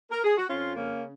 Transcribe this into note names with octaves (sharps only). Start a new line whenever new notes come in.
A#4
G#4
F#4
F2 C#4 F4
C#3 A#3 C#4